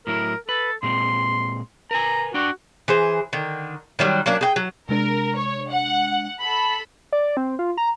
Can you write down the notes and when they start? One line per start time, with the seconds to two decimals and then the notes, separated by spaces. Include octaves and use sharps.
0.07 A2 F#3 E4 A#4
0.49 A4 B4
0.83 A#2 G#3 C4 C6
1.91 A#4 B4 G#5 A#5
2.34 D4 F#4 D5 G5
2.88 E3 G#4 C5
3.33 D3 D#3
3.99 D#3 F#3 G3
4.26 F#3 A#3 C#4 D4
4.41 G#4 G5
4.56 F#3
4.89 C3 G#3 D4 A#4
5.36 C#5
5.70 F#5
6.40 A4 B5
7.12 D5
7.37 C4
7.59 F4
7.77 A#5